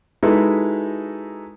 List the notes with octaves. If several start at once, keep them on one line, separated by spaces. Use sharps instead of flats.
G#3 D#4 E4 F#4 A4 B4